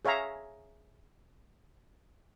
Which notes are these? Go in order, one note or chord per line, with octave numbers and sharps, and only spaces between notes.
G#4 C#5 E5 F5 A#5